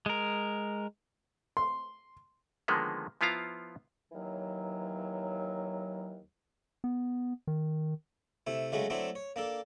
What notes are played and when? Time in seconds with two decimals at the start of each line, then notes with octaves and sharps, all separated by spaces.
0.06 G#3 A#4
1.57 C6
2.68 D3 D#3 F3 G#3 A#3 B3
3.21 F3 B3 E4 F4 F5 A#5
4.12 D#2 E3 F#3
6.84 B3
7.47 D#3
8.47 C3 A3 E4
8.72 C#3 F#3 G#3 A3 F#4
8.90 F#3 A3 C4 D4 E4
9.15 C#5
9.36 A#3 D4 A4